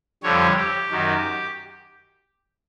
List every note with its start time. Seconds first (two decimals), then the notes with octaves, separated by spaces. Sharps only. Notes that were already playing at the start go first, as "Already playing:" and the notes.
0.23 F2 D3 G3 C#5
0.57 G4
0.90 F#2 D#3 F#3